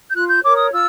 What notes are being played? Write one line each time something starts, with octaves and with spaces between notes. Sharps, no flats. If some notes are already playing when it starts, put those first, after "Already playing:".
G6
F4 F#6
G6
A#4 C#5 D6
D#6
F4 E6